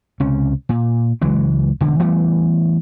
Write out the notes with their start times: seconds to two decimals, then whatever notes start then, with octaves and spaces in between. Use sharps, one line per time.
0.20 C#2 C3 C#4
0.69 A#2
1.21 C#2 E3 F#3 G#3
1.80 E1 D2 D3
1.99 E3 G3 A3 B3